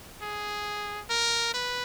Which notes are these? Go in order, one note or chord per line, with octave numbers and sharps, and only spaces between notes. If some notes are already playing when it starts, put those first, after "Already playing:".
G#4
A#4
B4